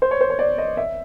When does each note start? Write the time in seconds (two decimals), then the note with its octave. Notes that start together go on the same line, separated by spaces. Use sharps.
0.02 C5
0.11 C#5
0.21 C5
0.30 C#5
0.39 D5
0.58 D#5
0.77 E5